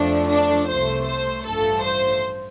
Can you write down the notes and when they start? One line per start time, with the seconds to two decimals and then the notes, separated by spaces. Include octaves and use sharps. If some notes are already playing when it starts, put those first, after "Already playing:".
Already playing: F2 F3 A3 D4
0.29 D4
0.67 C2 C3 A3 C5
1.06 C5
1.44 A1 G2 F3 A3 A4
1.83 C5